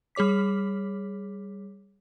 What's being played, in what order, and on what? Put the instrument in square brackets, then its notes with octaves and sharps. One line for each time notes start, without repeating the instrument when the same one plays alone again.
[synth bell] G3 G#4 C#5 D6 B6